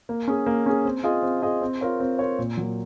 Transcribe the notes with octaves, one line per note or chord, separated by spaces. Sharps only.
A#3
C#4 G#4
A#3
C#4 G#4
C4
F4 G#4 D#5
C4
F4 G#4 D#5
C4
F4 A#4 C#5
C4
F4 A#4 C#5
A#2
F#3 A#3